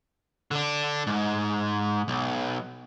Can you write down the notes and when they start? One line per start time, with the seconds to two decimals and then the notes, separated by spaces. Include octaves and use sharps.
0.51 D3 D4
1.07 G#2
2.08 B1